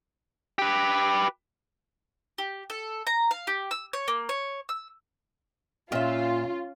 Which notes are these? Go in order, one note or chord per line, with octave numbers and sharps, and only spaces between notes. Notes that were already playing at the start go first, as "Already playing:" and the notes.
G4 B4
G4
A4
A#5
F5
G4
E6
C#5
A#3
C#5
E6
A#2 C#4 F4 E5